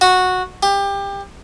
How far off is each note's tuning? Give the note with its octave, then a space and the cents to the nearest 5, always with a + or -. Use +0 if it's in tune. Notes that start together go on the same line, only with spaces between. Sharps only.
F#4 -10
G4 +25